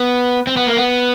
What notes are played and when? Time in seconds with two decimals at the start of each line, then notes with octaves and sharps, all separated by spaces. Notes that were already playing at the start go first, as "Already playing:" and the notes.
Already playing: B3
0.47 C4
0.57 B3
0.67 A#3
0.77 B3